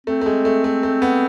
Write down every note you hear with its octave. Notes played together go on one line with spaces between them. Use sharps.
A3 C4
A3
G#3
A3
A3
A3
B3